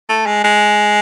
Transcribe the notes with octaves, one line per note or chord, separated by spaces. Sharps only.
A3
G#3
G#3